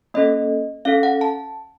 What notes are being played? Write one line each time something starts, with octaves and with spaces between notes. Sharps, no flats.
A#3 C#4 A4 D#5
C#4 A4 F5
F#5
A5